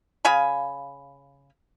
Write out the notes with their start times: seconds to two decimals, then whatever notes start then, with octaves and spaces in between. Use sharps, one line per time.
0.25 C#3 F5 G#5 B5